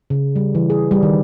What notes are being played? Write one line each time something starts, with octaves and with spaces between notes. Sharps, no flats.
C#3
G3
E3
G#4
G3
D#3